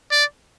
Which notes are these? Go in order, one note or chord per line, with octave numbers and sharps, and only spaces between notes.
D5